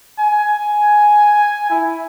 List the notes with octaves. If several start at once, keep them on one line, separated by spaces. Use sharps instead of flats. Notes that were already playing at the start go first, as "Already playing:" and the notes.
G#5
E4